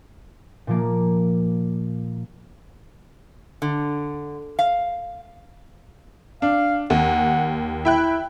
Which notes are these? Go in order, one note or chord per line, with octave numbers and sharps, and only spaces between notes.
A#2 F3 A#3
D3
F5
D4 F5
D#2 F#5
E4 E5 G5 F#6